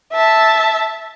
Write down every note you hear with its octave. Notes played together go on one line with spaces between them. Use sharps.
E5 A5